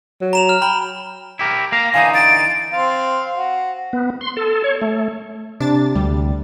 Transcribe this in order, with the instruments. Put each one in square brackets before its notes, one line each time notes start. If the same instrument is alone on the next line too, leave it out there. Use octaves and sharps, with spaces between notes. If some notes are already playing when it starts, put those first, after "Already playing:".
[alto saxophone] F#3
[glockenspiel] A#5 E7 F7
F6
[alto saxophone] G5 [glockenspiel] A#5 B5
[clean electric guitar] E4 G4 A#4
[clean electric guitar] A#3 F5 [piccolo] A#6
[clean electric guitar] D3 E3 D#4 [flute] F5 [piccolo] G#5
[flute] A6 [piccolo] D7
[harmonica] C4 F5 C6
F#4
[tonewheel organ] B3
C6
A4
C#5
A3
[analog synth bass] C3 [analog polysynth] D4 A6
[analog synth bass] D2 [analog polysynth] G3